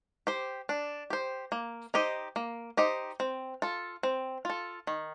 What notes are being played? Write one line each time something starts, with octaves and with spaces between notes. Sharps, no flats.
G4 C5
D4
G4 C5
A#3
D#4 G4 C5 D#5
A#3
D#4 G4 C5 D#5
C4
F4 A4
C4
F4 A4
D#3